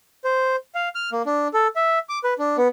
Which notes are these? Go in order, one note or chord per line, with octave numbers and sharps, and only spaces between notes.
C5
F5
F6
A#3
D4
A4
E5
D6
B4
D4
B3